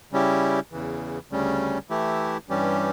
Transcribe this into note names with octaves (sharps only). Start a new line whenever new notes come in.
C#3 G3 C#4 E4 G4
E2 C#3 E3
D2 C#3 G3 C#4
E3 A3 E4 G4
G2 E3 G3 C#4 G4